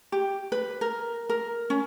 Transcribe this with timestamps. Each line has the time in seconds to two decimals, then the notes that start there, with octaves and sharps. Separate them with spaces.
0.12 G4
0.52 B4
0.81 A#4
1.29 A#4
1.70 C#4